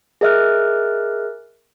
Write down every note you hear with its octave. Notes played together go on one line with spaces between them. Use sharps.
G#4 A#4 D#5 E5 F6 F#6